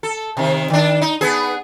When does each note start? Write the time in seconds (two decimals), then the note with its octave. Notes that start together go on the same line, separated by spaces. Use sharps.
0.03 A4
0.37 C3 D#3
0.70 D#3 D4
1.01 D#4
1.21 B3 G#4